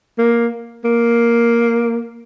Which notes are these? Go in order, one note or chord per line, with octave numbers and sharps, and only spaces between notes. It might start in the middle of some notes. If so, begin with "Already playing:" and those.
A#3
A#3